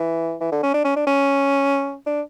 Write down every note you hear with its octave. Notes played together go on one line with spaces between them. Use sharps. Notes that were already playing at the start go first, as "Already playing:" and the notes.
Already playing: E3
E3
D3
C#4
D4
C#4
D4
C#4
D4